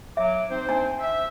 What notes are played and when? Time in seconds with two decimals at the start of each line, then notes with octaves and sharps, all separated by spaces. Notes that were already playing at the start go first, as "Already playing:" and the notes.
0.17 F#3 E5 D6
0.50 C4 D#4 C5
0.69 D4 A5
1.00 E5